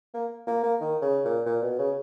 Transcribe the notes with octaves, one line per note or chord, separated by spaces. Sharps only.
A#3
A#3
A#3
D#3
C#3
A#2
A#2
B2
C#3